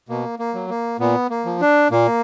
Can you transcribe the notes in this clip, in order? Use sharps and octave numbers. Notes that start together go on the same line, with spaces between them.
B2 A#3
A#3
F#3
A#3
A#2 B3
A#3
F3
D4
A#2 A#3